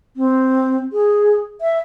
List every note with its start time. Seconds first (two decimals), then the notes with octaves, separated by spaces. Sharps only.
0.17 C4
0.93 G#4
1.61 E5